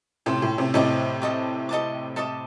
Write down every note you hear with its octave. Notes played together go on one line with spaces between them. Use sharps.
A2 C3 A4 C5 G5
A2
A2 C3
A2 C3 A4 D#5 A5 D6
A4 D#5 A5 D6
A4 D#5 A5 D6
A4 D#5 A5 D6